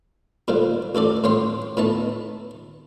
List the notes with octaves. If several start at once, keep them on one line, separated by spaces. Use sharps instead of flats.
A#2 D3 D#3 F3
A1 D#3 A4 D5
A2 C#4 G5 C6
A2 B3 D#4 A5